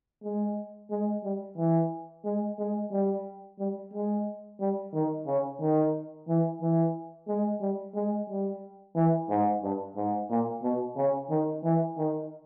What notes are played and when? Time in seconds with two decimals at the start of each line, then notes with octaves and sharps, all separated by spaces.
0.24 G#3
0.91 G#3
1.24 G3
1.58 E3
2.25 G#3
2.59 G#3
2.92 G3
3.59 G3
3.93 G#3
4.61 G3
4.93 D#3
5.27 C#3
5.61 D#3
6.28 E3
6.62 E3
7.28 G#3
7.61 G3
7.95 G#3
8.29 G3
8.96 E3
9.29 G#2
9.63 G2
9.96 G#2
10.30 A#2
10.63 B2
10.97 C#3
11.30 D#3
11.64 E3
11.98 D#3